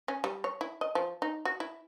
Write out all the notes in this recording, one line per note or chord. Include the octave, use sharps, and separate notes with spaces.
C#4
G3
C#5
E4
D#5
F3
D#4
F#4
E4